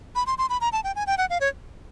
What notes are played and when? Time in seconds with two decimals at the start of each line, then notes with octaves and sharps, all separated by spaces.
0.15 B5
0.27 C6
0.38 C6
0.50 B5
0.61 A#5
0.73 A5
0.84 G5
0.96 G#5
1.07 G5
1.18 F#5
1.30 F5
1.41 C#5